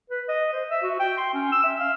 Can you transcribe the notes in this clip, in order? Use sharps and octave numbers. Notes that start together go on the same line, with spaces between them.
B4
D#5
C5
E5
F#4
G5
C6
C#4
E6
E5
F5